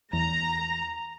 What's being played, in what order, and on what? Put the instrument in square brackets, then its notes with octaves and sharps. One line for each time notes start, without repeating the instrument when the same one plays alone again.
[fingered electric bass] E2 [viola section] A#5